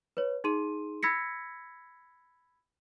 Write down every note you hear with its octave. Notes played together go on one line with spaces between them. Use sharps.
B4 C#5
D#4 G#4 C6 D#7
B5 E6 G#6 A#6 B6 C#7